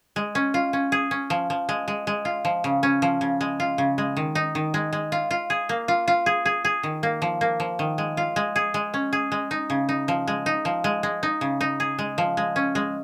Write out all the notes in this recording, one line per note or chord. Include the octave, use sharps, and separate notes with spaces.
G#3
C#4
F4
C#4
G#4
C#4
F3
F3
G#3
G#3
G#3
F4
F3
C#3
C#4
F3
C#3
G#3
F4
C#3
G#3
D#3
D#4
D#3
G#3
G#3
F4
F4
G#4
A#3
F4
F4
G#4
G#4
G#4
D#3
A#3
F3
A#3
F3
D#3
G#3
F4
G#3
G#4
G#3
C#4
G#4
G#3
D#4
C#3
D#4
F3
G#3
D#4
F3
G#3
G#3
D#4
C#3
D#4
G#4
G#3
F3
G#3
C#4
G#3